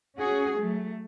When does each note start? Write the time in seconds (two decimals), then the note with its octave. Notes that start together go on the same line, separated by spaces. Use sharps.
0.17 C#4 F#4 G#4
0.56 F#3 A3